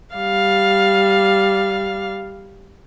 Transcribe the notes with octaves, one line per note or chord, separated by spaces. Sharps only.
G3 F5